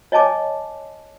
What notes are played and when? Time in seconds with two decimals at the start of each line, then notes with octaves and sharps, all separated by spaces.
0.12 C#5 D#5 G#5 A5 D6